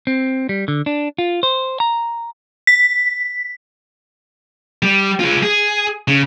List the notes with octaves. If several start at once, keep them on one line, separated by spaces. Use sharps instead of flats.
C4
G3
D3
D4
F4
C5
A#5
B6
G3
G#3 F4
G#4
C#3